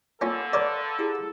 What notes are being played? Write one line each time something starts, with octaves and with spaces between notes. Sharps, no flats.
G2 D3 A#3 C#4 F4 A4
A#4 B4 C#5 D5
E4 G4 G#4